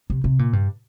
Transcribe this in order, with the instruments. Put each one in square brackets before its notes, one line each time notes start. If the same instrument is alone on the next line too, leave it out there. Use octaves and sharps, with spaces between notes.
[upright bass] C3
C3
A#2
G2